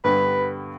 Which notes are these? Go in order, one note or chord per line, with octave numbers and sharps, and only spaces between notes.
G2 D3 G3 B3 B4